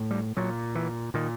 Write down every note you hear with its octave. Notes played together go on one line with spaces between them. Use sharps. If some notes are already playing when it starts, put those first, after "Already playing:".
Already playing: A2
G3
A#2 F#3
E3
A#2 D#3